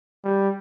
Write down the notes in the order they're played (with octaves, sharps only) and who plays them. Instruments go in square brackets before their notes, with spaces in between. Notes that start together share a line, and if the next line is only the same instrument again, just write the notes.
[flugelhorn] G3